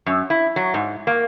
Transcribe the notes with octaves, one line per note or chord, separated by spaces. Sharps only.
F#2
E4
F#3
G#2
A#3